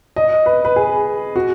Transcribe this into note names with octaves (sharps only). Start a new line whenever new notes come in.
D#5
B4
B4
G#4
F#4